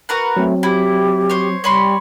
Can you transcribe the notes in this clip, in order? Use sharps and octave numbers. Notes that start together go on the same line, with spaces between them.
F#4 A#4 B4
F#3 A3 C4
E4 G4
C5 C#5
G3 C#5 B5 C6